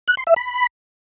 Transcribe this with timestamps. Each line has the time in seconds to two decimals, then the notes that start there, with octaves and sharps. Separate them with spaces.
0.08 F#6
0.17 C6
0.27 E5
0.36 B5